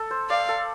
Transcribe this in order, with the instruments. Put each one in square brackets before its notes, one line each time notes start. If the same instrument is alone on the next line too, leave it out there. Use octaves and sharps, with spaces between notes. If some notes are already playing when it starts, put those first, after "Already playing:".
Already playing: [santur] A4
C5
[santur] D5 [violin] F5
[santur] A4